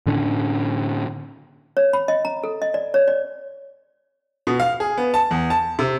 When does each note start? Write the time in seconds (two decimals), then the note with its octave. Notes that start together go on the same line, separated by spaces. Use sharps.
0.06 A2 D3 C#4 D4
1.77 C#5
1.93 B5
2.08 D#5
2.25 A#5
2.44 A4
2.62 D#5
2.74 D5
2.94 C#5
3.08 D5
4.47 B2
4.60 F5
4.80 G#4
4.98 B3
5.14 A5
5.31 E2
5.50 A5
5.79 C3